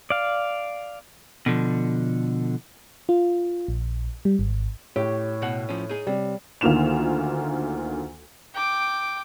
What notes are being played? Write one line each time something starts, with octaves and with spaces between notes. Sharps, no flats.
D5 F5
B2 D3 F3
F4
A#1
G3
G#1
A2 G4 C#5
B2 F#5
F3 C#4
D#4 G#4
C3 G3
D2 D#3 A#3 F4 E7 F7
G5 D6